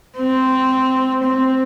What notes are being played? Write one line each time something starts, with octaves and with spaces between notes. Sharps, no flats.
C4
C4